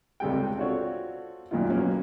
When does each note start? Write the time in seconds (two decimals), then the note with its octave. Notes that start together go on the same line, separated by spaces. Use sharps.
0.20 C#2 C3 G3 G#3 A4 G5
0.57 C4 D4 F4 F#4 A4 C#5
1.51 F#2 A#2 D#3 F4
1.70 B1 F#3 A#3 C#4